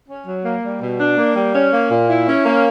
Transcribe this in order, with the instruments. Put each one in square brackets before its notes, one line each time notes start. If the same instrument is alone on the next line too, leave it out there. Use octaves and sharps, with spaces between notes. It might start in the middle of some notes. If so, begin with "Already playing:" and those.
[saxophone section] C#4
F#3
A#3
G3
B2
D4
A#3
G3
C#4
A#3
A#2
E4
C#4
A#3